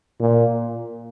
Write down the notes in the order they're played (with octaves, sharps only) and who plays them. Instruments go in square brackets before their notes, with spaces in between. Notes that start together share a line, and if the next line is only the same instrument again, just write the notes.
[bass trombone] A#2